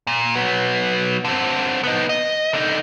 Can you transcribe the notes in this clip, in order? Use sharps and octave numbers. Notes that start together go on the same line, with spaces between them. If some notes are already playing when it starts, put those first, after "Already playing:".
A#2
F#3 B3
D3 C4
B3 D#4
D#5
D3 D#4